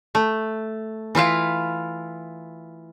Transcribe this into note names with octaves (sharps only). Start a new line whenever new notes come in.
A3
E3 E4 F4 F5